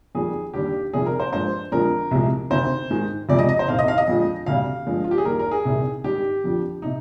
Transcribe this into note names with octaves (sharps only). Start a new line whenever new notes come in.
F2 D#3 G3 G#4
D#2 D3 G3 G4
F2 C3 D#3 G3 G#4
A#4
C5
G2 F3 G#3 C5
F2 D3 F3 G#3 A#4
C2 C3 F3 G#3
D2 C3 D#3 C5
G#2 D#3 G#3
D2 C3 F3 G#3 D5
D#5
D#5
C5
C2 C3 D#3 F5
D#5
F5
D#5
F2 D3 F3 G#3
D2 C3 G3 F5
G2 D3 F3 G#3
F4
G4
G#4
D#2 D#3 G3 A#4
A#4
G#4
C2 C3 D#3 G3
G#2 D#3 G3 G4
F2 D3 F3
C3 D#4